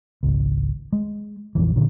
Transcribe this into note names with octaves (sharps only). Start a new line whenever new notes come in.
G#1 C#2
G#3
A#1 F2 E3
A#2 D3 D#3